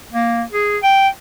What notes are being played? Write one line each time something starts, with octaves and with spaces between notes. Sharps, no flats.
A#3
G#4
G5